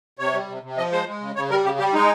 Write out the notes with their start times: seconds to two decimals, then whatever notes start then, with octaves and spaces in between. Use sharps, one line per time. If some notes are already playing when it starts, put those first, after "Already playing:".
0.19 C3 C#5
0.34 G3
0.48 C3
0.63 C3
0.77 F3 D#5
0.92 G#3 C5
1.06 G#3
1.21 C#3
1.36 C#3 C#5
1.50 G3 A#4
1.65 C#3 G4
1.79 G3 G4
1.93 G#3 D#4